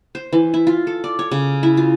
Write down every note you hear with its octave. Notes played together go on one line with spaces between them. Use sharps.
C5
E3
E4
F4
A4
D5
C#5
C#3
E4
F4